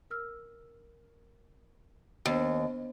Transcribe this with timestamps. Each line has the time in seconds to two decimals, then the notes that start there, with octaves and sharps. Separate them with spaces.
0.10 A#4 E6 F6
2.26 D#2 B3 D4 C5